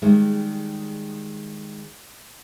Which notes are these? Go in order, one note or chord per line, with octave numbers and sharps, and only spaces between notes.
D#3 G3 G#3